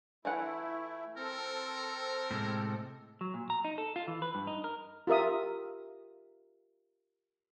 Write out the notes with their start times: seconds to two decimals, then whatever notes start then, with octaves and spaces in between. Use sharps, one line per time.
0.25 E3 A3 E4 F4 F#5
1.17 C4 A4 A#4
2.31 A2 C3 G#3
3.21 F#3
3.34 A#2
3.50 A#5
3.65 D#4
3.78 A4
3.96 F4
4.08 E3
4.22 B4
4.35 G2
4.47 D#4
4.64 A#4
5.07 F4 G4 A#4 E5 D#6